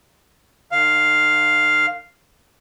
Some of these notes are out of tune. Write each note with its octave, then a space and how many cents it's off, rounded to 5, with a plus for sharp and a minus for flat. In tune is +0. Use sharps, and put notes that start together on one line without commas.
D#3 -45 F5 +0